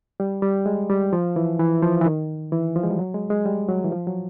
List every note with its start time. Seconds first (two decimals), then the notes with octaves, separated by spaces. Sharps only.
0.20 G3
0.42 G3
0.66 G#3
0.90 G3
1.13 F3
1.36 E3
1.59 E3
1.82 F3
2.01 E3
2.06 D#3
2.52 E3
2.76 F3
2.84 G#3
2.91 G3
2.99 F#3
3.14 G#3
3.30 G#3
3.45 G3
3.68 F#3
3.84 E3
3.92 F3
4.07 F#3